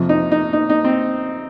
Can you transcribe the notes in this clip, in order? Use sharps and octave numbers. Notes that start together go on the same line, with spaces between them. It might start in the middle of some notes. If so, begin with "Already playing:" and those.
Already playing: F2 C3 F3
D#4
D#4
D#4
D#4
C4